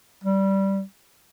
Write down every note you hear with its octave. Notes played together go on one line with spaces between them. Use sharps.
G3